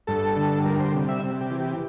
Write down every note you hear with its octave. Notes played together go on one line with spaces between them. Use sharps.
G2 A4
D3
G3 A#4
C5
C3
E5
C3
G4
E3
G4